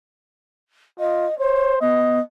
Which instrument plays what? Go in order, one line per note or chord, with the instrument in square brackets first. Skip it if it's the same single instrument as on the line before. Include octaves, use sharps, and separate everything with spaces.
[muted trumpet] F4 [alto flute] D#5
[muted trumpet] C5 [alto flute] C#5
[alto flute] B3 [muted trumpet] D#5